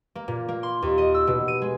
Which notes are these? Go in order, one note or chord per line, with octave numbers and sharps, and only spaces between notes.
A#3
A#2
A#3
C6
D#2
D#5
E6
B2
D#7
G#3